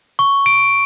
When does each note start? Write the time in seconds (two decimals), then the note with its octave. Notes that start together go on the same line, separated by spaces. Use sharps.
0.19 C#6
0.46 D7